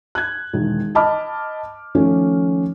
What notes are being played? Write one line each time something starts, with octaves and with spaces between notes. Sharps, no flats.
F#6 G#6
E1 D#3
D#5 A5 B5 D6 F6
D#3 F3 A3 C#4